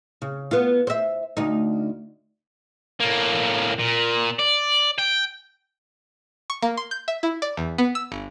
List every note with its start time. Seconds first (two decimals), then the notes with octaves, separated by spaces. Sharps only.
0.22 C#3
0.51 B3 F4
0.87 C5 E5
1.37 D2 D#4
3.00 A2 A#3
3.79 A#2
4.39 D5
4.98 G5
6.50 C#6
6.62 A#3
6.77 C6
6.91 G6
7.08 E5
7.23 E4
7.42 D5
7.57 E2
7.78 B3
7.95 E6
8.12 G1